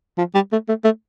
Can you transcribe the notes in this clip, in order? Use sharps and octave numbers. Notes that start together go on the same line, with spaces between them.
F3
G3
A3
A3
A3